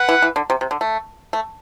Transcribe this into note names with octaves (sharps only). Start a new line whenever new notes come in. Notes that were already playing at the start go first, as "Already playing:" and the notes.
Already playing: B4 F#5
E3
E3
D3
C3
C3
D3
A3
A3